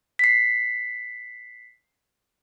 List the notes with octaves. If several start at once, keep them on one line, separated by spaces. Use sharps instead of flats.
B6 C7